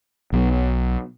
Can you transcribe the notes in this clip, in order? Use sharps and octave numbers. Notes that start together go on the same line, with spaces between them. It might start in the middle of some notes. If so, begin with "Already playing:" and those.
B1 B2 F#3